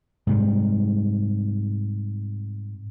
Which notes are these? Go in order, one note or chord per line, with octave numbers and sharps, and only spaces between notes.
G#2 C3 G3